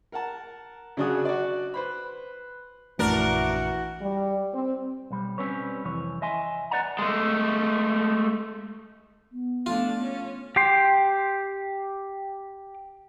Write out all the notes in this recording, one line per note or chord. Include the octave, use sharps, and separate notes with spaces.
A#4 F#5 A5
C#3 F#3 D4 F#4 G#5 D#6
F#4 D5
B4 C5 B5
A#1 F#2 E3 A3 D4 F#4 A#4
G3
C4
B1 G3
G3 C4 C#4 B4 C#5
C2 F2 E3 C#5
D#5 E5 G#5 C6
B4 C5 D5 D#5 F#5 A#5
G#3 A3
B3
A3 D4 F4
C#4
G4 G5 C6